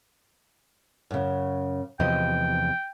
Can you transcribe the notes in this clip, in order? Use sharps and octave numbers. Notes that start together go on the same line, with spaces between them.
F#2 C#3
E2 C3 F3 D#5 G5